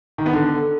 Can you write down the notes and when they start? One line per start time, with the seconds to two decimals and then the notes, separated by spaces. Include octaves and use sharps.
0.18 D#3
0.26 B3
0.33 D3